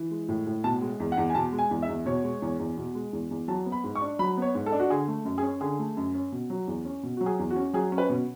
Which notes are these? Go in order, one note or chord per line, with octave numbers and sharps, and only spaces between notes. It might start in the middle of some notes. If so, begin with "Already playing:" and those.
Already playing: E3
G#3
A2
A2
B2 A5
G#3
E2
F#5
E2
G#5
B2 A5
G#3
G#5
E2
E5
E2
B2 C#5
G#3
E2
E2
B2
G#3
E2
E2
F#3 A5
B3
B5
G#2
C#6
D4
F#3 B5
B3 C#5
G#2
A4
D4
F#4
D3 G#4
A3
F#2
G#4
C#4
D3 G#4
A3
F#2
C#4
B2
F#3
E2
C#4
B2
F#3 F#4
G#4
E2
F#4
C#4
F#3 G#4
C#4
B4
B2